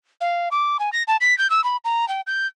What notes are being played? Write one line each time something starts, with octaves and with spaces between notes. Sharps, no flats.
F5
D6
G#5
A#6
A5
B6
G6
E6
B5
A#5
G5
G6